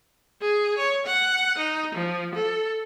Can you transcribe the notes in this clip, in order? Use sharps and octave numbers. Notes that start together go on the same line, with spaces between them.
G#4
C#5
F#5
D#4
F3
A4